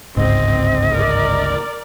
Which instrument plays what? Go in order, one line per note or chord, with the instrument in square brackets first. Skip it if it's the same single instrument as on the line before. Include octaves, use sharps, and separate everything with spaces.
[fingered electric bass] G1 C#2 [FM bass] G#2 [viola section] C4 [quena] D#5
[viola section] A#4 D5